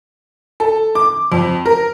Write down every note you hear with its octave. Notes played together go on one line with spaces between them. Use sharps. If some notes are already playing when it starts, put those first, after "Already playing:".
A4
D6
F2
A#4